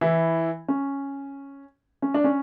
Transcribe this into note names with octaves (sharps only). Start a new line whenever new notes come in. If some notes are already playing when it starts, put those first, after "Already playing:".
E3 E4
C#4
C#4
D4
C#4